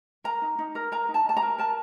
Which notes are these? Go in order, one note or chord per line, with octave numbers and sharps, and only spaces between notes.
A#4 A#5
D#4
D#4
A#4
A#4 A#5
D#4
A5
D#4 A5
A#5
A#4
A#4 A5